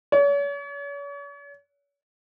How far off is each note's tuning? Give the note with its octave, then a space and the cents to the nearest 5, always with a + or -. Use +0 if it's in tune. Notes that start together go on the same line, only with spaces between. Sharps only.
C#5 +40